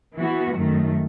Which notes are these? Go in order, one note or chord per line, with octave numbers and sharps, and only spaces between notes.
E3 B3 F#4
F#2 D#3 A3